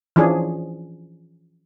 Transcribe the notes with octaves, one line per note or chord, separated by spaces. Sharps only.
E3 F3 C#4 D4 G#4